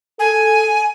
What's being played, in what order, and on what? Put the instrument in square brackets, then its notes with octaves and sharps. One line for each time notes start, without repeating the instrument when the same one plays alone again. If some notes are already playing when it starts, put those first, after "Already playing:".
[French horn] A4 [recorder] G#5